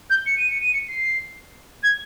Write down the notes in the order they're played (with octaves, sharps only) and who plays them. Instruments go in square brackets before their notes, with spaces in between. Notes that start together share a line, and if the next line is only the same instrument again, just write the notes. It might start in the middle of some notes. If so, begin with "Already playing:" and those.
[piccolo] G6
C#7
D#7
C#7
D#7
C#7
C7
G#6